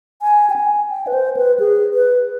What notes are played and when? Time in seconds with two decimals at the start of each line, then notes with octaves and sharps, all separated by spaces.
0.22 G#5
0.50 G5
0.56 G#5
0.91 G5
1.07 B4
1.13 C5
1.37 B4
1.60 G#4
1.94 B4